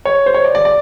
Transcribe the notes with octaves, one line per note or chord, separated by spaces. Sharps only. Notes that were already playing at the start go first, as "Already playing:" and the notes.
C#5
C5
C#5
D5
D5
D5